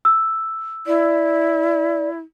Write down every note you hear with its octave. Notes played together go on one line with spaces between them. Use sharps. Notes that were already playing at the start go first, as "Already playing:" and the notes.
E6
E4 D5